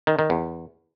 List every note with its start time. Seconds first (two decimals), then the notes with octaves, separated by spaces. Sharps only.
0.07 D#3
0.19 D#3
0.30 E2